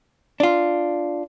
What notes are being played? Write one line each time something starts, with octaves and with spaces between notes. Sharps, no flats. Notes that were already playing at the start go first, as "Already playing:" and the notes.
D4 F4